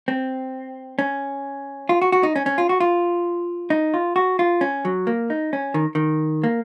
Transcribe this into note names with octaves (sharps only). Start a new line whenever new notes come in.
C4
C#4
F4
F#4
F#4
D#4
C#4
C#4
F4
F#4
F4
D#4
F4
F#4
F4
C#4
F#3
A#3
D#4
C#4
D#3
D#3
A#3